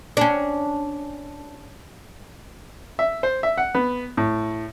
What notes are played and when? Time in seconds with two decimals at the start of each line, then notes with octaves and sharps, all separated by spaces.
0.17 C#4 D4
2.99 E5
3.23 C5
3.43 E5
3.58 F#5
3.75 B3
4.17 A2